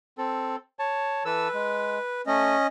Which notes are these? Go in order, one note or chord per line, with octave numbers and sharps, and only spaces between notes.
C4 A4
C#5 A5
E3 A4 B4 E6
G#3
A3 C#4 D#5